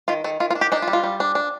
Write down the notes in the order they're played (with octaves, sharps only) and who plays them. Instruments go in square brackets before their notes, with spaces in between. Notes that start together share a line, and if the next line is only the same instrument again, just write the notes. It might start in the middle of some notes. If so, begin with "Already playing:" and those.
[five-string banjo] D#3 F4
D#3 A4
D#3 F4
F4
D4
G4
D4 D#4
F4
G3
F4
G3
D4
D4